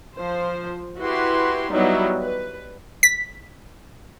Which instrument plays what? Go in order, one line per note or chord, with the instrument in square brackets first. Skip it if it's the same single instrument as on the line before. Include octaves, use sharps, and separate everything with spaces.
[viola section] F3 C5
E4 F#4 G4 B4 C6
F#3 G3 B3 D#4 E4 F#4
B4
[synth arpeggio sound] B6